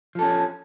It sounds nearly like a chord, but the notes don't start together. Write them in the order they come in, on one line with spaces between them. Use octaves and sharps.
F3 A4 C#4